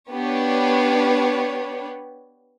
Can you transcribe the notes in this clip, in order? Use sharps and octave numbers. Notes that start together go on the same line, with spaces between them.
B3 D4 G4 B4 C#5